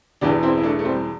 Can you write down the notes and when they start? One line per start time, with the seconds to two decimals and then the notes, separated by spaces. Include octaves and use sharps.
0.21 E1 E2 E3 D4 G4
0.43 C4 E4
0.57 E4
0.63 A3 D4
0.79 A3
0.85 G3 C4